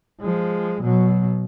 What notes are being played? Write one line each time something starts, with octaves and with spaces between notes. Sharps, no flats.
F3 G#3
B2 F#3